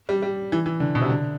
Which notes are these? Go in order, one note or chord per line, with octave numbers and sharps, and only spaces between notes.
G3
G3
E3
E3
D3
B2
C3
D3